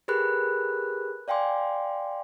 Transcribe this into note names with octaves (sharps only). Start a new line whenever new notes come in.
G4 G#4 A#4 B4 B5 F#6
D5 F5 G5 G#5 C6 D6